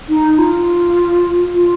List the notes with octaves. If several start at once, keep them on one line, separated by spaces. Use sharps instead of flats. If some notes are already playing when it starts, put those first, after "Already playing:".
D#4
F4
F4